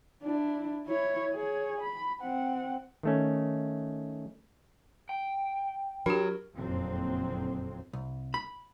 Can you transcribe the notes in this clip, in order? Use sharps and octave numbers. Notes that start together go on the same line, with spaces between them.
D4 E4
E4 C#5
G#4 C#5
B5
C4 F#5
D#3 A3 C#4
G5
F#3 D4 G4 A#4
F#1 F2 A#2 D3 F#3 C4
C2
B5